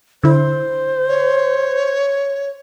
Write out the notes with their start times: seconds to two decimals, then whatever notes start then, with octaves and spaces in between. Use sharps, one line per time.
0.23 D3 E4 C5
1.08 C#5